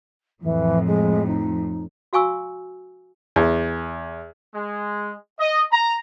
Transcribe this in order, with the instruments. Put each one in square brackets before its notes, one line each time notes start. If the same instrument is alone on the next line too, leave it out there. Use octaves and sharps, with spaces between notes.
[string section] F2 A2 [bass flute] E3
[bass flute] G#3
D#4
[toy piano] F#4 F5 G#5 C#6 E6
[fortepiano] E2
[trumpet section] G#3
D#5
A#5